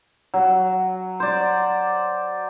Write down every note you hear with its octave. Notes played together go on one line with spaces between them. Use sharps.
F#3
C5 D5